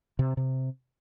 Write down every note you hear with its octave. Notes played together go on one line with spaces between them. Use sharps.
C3
C3